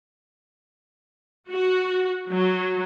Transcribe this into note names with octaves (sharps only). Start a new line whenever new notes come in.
F#4
F#3